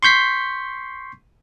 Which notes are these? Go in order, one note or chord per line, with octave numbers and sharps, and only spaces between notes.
C6 C#6 G6 B6 C7